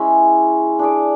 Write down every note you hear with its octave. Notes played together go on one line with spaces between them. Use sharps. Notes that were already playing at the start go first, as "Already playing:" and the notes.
Already playing: G#3 C#4 E4
D4 G#4 D5